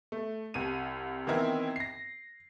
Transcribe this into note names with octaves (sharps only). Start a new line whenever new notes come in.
A3
C2 C3 D#7
D#3 E3 B3 C4 E4 A#4
A#6 C7